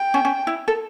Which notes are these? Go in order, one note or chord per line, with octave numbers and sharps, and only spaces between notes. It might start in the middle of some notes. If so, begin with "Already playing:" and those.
Already playing: G5
C#4
C#4
E4
A4